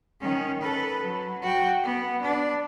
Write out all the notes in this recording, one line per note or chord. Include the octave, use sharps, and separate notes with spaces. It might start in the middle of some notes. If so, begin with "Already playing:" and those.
D#3 C#4
A4 B4
F#3
F#4 G5
B3
D4